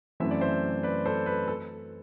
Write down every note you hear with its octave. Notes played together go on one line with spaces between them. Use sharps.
F#2 E3 A3 C4 E4 E5
D5
C5 E5
B4 D5
A4 C5
B4
A4